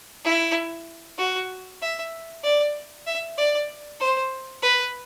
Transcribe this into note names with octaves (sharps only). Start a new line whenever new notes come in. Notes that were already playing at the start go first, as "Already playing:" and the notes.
E4
F#4
E5
D5
E5
D5
C5
B4